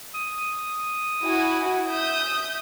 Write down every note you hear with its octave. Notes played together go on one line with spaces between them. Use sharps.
D#6
E4 F#4 G#5
E5 D#6 G6